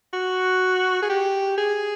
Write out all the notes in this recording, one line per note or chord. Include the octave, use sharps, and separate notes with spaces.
F#4
G#4
G4
G#4